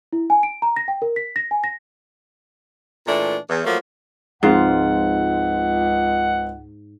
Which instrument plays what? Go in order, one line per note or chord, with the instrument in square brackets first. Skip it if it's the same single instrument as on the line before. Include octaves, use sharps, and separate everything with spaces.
[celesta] E4
G#5
D7
A#5
A#6
G5
A#4
B6
A#6
G#5
A#6
[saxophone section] A#2 E3 A3 D4
E2
F3 F#3 A3 A#3
[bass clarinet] C#2 [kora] G#2 F4 F5 [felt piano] F3 C4 [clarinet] F#5